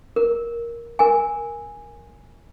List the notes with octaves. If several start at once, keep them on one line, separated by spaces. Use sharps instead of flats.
A#4
A#4 G#5